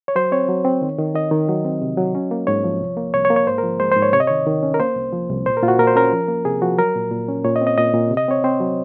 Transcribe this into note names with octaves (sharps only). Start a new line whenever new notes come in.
C#5
F#3 C5
C4 C#5
F#3
C4
D#3
D#3
D#3 D#5
D#3
F#3
C4
C3
F#3
C#4
A#3
G#2 C#5
F3
C2
A#3
C2 C#5
C#5
A#3
C#5
G#2 C5
A#4
F3
G#3 C5
C5
G#2
C#5
C3 C#5
D#5
D#3 C#5
D#3
C#4
A#4
A#3 C5
C2
F3
C2
A#2 C5
A#4
A#2 F4
F#4
A#2 A#4
C5
C#4 A#4
F3
A#3
C3 G#4
F3 F#4
F#3 A#4
A#2
A#2
C#4
A#2 C#5
D#5
C4
D#5
A#2 D#5
A#2
C3
D#5
C4 C#5
C4 C5
F#3